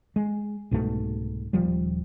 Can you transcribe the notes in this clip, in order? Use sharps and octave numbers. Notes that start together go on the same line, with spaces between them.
G#3
C2 G#2 B2 A3
D#1 F3 G3